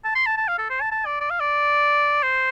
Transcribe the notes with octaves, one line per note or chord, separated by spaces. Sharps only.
A5
C6
A5
A5
F5
A4
C5
A5
A5
D5
D5
F5
D5
C5